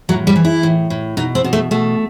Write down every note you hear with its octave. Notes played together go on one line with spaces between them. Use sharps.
A2 F#3
G3
E3
E4
A2
A2
B2 D#4
C4
B2
A3
B2 A3